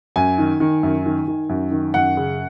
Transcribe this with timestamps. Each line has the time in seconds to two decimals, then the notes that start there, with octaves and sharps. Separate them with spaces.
0.16 F#2 G#5
0.38 D#3
0.60 D#3
0.83 F#2
1.06 D#3
1.27 D#3
1.49 F#2
1.72 D#3
1.94 F#2 F#5
2.17 C#3